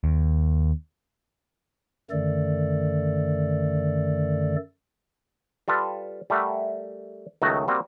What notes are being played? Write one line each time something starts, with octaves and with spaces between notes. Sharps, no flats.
D#2
F#2 D3 D#3 A3 A4 D5
G3 F4 A4 B4
G3 A3 A#4 E5 F#5
C#2 D#3 F#3 A3 F#4 D#5
G3 A#3 C4 F#4